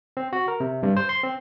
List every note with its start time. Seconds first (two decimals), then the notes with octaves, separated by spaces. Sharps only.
0.17 C4
0.33 F#4
0.48 A#4
0.60 C3
0.83 G2
0.97 C5
1.09 C6
1.23 C4